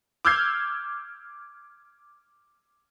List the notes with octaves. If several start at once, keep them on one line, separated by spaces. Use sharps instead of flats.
D6 E6 F6 G6 G#6 C7